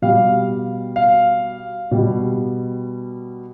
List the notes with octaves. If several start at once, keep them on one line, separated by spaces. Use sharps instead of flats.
B2 G3 F5
F5
B2 G3